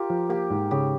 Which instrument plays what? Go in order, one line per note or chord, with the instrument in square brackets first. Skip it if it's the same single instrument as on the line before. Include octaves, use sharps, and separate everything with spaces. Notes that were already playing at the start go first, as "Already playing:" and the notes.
Already playing: [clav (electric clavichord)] F4 [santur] G4 A#4
[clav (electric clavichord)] F3
[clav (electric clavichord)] A#3 [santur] G4
[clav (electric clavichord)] G#2
[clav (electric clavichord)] C#3 [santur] G4